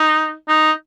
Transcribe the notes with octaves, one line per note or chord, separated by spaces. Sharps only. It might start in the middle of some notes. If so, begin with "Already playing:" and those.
Already playing: D#4
D#4